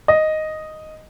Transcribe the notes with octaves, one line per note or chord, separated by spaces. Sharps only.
D#5